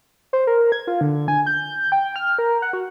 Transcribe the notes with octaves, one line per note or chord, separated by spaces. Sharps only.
C5
A#4
G#6
F4
D3
G#5
G6
G5
F6
A#4
F#5
F#4